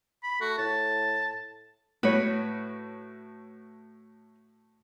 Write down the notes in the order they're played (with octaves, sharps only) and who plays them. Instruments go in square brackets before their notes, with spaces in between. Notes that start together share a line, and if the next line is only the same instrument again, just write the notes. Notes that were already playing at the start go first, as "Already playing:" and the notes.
[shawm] B5
[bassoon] A3 [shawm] F#4
[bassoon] A2 [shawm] A5
[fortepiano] A2 F#4 [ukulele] B4 C#5